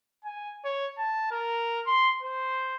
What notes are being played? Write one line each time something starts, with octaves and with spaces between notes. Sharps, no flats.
G#5
C#5
A5
A#4
C6
C5